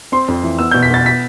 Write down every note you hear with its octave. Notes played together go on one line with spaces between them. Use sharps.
C4 C6
F2
E3
B3 E6
B2 G6
B6
B3 A6
B6